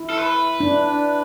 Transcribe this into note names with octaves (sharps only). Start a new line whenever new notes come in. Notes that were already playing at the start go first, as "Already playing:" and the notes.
Already playing: E4
A4
B4
D4